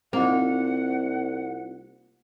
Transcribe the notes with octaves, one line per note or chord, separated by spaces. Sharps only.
C2 A#3 C4 D#4 F4 F#5